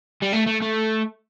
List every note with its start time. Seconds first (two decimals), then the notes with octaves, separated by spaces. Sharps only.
0.22 G3
0.33 A3
0.47 A3
0.62 A3